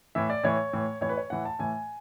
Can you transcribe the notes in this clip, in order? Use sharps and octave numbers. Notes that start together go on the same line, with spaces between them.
A2 E3 E5
D5
A2 E3 C#5
A2 E3
A2 E3 C#5
B4
C#5
A2 E3 F#5
A5
A2 E3 G#5